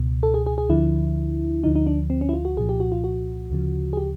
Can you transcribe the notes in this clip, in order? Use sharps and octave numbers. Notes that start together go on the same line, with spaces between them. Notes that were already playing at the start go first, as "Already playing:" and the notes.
Already playing: C#2 B2
A4
G#4
G#4
G#4
D2 D3 F3 E4
D2 D3 F3 D#4
D#4
D4
C4
C#4
E4
F4
F#4
C2 A#2 F3 G#4
G4
F#4
F4
F#4
D2 C#3 F3
G#4
G4